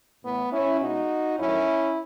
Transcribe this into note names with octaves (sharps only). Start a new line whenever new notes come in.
A2 E3 A3 B3
C#4 E4
B2 G#3 D#4 F#4
F#2 D#3 F#3 A3 C#4 E4